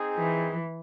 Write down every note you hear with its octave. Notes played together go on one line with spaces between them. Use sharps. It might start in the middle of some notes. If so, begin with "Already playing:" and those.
Already playing: C4 D#4 G#4
E3